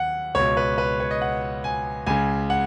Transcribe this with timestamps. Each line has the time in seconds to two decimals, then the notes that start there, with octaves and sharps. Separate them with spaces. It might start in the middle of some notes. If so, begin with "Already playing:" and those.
Already playing: D#2 F#5
0.35 C#2 B2 C#5
0.57 B4
0.78 B4
1.00 C#5
1.11 D#5
1.21 F#5
1.64 G#5
2.07 C#2 C#3 G#5
2.50 F#5